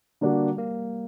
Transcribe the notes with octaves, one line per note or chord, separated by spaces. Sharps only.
D3 G3 A#3 D4 F#4
A#3